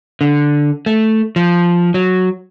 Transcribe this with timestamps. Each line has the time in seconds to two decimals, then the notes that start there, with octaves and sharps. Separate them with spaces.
0.21 D3
0.86 A3
1.36 F3
1.94 F#3